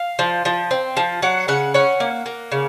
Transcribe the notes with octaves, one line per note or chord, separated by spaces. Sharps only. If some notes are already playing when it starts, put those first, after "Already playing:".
Already playing: F5
F3
F3
C4
F3
F#3 F#5
C#3 F#5
C#4 F#5
A#3
A#3
C#3